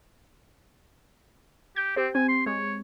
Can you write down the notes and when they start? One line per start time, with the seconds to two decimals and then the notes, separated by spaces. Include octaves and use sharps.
1.76 G4 G6
1.96 C4 G4 C5
2.15 C4 G#5
2.28 C6
2.46 G#3 C#5